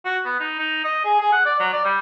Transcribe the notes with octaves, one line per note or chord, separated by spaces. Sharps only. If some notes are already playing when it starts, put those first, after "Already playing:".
F#4
B3
D#4
D#4
D#5
G#4
G#4
F#5
D5
F#3
D5
G3